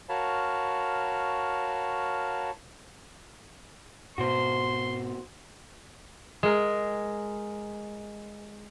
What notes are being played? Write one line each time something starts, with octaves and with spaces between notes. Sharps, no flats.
F#4 A#4 C#5 F5 A5 B5
G#2 B2 B3 F#4 C5 C6
G#3 A#4